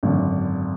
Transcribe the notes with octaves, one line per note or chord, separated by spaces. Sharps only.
G#1 F#2 D3